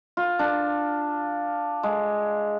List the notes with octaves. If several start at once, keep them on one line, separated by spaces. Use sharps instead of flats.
F4
D4
G#3